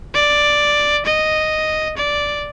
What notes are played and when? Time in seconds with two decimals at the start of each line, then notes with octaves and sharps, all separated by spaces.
0.15 D5
1.06 D#5
1.97 D5